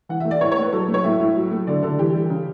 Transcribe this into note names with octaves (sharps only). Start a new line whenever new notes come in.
E3 F#5
E5
A3
D5
A2 C#5
C#5
A2 B4
F#3 A4
A3
C#5
A2 E5
A2
F#3
A3
D3 D5
D3 A4
E3 G4
G3
C#3